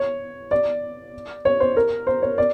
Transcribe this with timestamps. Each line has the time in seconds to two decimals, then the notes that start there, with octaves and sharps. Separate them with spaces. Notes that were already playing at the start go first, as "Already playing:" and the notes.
Already playing: C#5
0.51 D5
1.45 C#5
1.60 C5
1.77 A#4
2.07 C5
2.22 C#5
2.38 D5